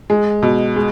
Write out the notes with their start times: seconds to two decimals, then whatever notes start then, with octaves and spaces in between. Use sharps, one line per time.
0.10 G#3
0.42 B2
0.76 G#3